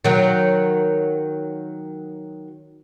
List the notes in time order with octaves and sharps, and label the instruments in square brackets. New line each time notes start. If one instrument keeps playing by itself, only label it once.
[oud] D#3 F#3